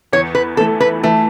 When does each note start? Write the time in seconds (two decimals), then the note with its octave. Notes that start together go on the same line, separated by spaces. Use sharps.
0.13 E2 C#5
0.35 B4
0.57 E3 A3 A4
0.80 B4
1.03 E3 A3